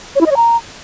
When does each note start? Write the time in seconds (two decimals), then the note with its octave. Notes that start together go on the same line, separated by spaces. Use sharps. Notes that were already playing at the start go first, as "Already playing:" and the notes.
0.15 C#5
0.21 E4
0.26 D#5
0.31 C#5
0.36 A#5